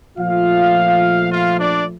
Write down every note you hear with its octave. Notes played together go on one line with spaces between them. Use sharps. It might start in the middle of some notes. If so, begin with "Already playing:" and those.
A#2 F3 A3 F4 F5
F4 F5
D4 D5